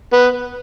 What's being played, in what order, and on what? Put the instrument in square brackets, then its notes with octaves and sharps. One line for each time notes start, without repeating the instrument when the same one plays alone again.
[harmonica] B3